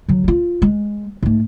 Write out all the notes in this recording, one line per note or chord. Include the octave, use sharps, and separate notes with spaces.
D3 F#3
D#4 F4
G#3
G#2 A3